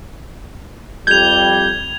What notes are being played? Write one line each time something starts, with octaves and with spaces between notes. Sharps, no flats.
F2 G3 G6 G#6 F7